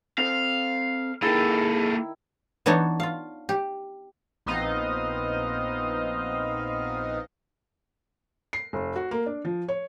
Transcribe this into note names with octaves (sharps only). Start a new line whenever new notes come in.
C4 A4 C5 F5
D#3 A#3 E4 G#4 A4
E3 B3 D4 D#4 C#5 A5
F4 F5
G4
A#1 B3 C4 D#4 D#5 F5
C7
F1
F#4
A#3
D4
F3
C#5